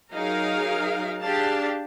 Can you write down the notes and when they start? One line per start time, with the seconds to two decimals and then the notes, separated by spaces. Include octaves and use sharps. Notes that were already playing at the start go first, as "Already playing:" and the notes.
0.12 F#3 D#4 G#4 A#4 F5
1.23 D4 G4 G#4 F5 A5